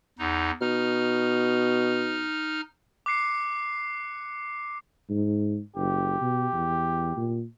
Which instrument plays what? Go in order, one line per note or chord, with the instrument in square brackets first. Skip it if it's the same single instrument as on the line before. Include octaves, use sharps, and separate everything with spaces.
[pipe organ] E2 D#4
[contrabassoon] B2 [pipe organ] D#4 F6
[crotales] D6 F#6 C7 C#7
[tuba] G#2
[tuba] F#1 [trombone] G4
[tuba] B2
E2
A#2